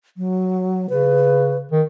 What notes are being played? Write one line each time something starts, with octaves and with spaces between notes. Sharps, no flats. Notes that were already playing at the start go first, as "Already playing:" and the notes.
F#3
C#3 B4
D#3